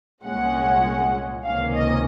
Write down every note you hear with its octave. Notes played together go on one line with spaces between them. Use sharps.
C2 A#2 G#3 C#4 F#5
C#2 C3 D#3 A#3 C#4 F5
D#5